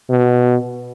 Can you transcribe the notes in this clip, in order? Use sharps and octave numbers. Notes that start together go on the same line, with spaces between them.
B2